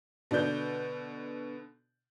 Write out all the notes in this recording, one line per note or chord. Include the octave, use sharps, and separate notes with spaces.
B2 D3 D5 G6